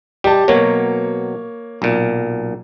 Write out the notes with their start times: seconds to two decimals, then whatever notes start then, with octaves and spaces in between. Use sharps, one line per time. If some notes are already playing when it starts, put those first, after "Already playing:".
0.24 G3 G4 D#5 A5
0.48 B2 F#3 A#3 C#5
1.82 B1 A#2